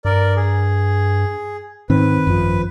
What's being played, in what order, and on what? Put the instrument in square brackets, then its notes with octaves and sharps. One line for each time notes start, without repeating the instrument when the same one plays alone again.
[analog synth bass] G2 [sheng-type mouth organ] A#4 D5
[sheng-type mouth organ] G#4
[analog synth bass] G#2 [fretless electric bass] D#3 C4 [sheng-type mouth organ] B4
[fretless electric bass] G#1 F3 [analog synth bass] F#2